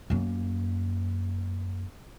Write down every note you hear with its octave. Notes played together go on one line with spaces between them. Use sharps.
F#2 A#3